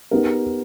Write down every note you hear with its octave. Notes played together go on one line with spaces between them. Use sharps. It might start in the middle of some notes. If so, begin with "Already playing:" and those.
B3 D#4 G4 A#4